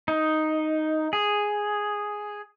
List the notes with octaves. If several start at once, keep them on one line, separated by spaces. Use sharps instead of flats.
D#4
G#4